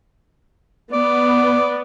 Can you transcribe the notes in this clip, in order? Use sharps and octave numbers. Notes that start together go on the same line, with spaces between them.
B3 D5